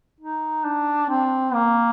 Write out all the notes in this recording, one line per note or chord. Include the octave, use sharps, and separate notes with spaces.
D#4
D4
C4
A#3